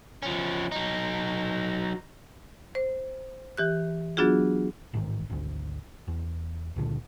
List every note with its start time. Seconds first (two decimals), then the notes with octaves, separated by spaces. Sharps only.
0.23 F3 C#4
0.72 F#3 D#4
2.75 C5
3.57 E3 G4 F#6
4.17 F#3 B3 D4 F4 F#4 G#4
4.93 A1 G#2 D#3
5.30 G#1 D2
6.08 E2
6.76 C#2 A#2 D3